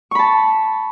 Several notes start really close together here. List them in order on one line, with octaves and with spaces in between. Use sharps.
C#6 B5 A5